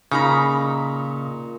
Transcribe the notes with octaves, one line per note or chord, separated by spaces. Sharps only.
A#2 C#3 D#4 A#5 B5